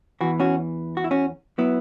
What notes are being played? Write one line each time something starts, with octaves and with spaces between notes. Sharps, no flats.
E2 E3 F#4
C#4 F#4
F#4
E4
C#4 F#4
F#3 B3 E4